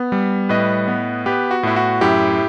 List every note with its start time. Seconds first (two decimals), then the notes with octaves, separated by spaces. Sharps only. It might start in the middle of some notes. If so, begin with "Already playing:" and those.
Already playing: B3
0.12 G3
0.49 A2 B4 D#5
0.88 B3
1.26 B3 G4 B4
1.51 F#4
1.63 A2 E4
1.76 F#4
2.01 F#2 E4 G4